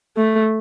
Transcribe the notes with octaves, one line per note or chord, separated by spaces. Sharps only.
A3